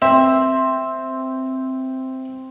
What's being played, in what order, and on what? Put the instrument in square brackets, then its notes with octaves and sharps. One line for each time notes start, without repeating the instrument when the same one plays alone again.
[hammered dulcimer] C4 [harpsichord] E5